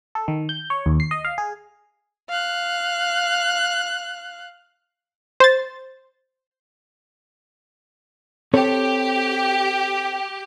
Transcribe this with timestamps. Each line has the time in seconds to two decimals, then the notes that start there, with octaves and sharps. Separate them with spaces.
0.15 A4
0.28 D#3
0.49 G6
0.70 C#5
0.86 D#2
1.00 C7
1.11 D#5
1.25 F5
1.38 G#4
2.29 F5 F#6
5.40 C5 A6
8.54 C4 G4 A4 C#5